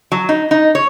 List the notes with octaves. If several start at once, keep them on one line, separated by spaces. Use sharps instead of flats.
F#3
D#4
D#4
C#5